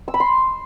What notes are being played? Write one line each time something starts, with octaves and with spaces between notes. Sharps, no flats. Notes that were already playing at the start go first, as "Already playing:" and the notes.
E6
B5
C6